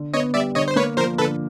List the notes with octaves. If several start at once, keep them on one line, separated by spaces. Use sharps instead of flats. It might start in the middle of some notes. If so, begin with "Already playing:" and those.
Already playing: D3
B3 C#5 D#5
G3 D5 E5
D3 C#5 D#5
C5
A#3 B4 C#5
F3 A#4 C5
D3 A4 B4